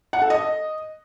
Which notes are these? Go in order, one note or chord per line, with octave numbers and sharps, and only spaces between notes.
F#5
A4
D#5